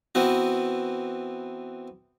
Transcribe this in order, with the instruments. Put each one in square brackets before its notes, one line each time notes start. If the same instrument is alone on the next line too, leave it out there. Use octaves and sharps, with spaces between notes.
[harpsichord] E3 B3 C4 F#4